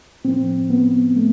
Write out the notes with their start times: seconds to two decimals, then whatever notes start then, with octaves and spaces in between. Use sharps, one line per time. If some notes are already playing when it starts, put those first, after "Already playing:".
0.24 A2 F3 C4
0.70 B3
1.16 A3